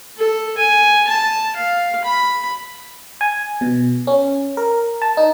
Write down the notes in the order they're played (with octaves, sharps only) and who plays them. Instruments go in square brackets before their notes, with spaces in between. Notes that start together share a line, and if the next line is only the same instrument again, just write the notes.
[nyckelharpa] A4
G#5
A5
F5
B5
[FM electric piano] G#5
B2
C#4
A#4
A5
D#4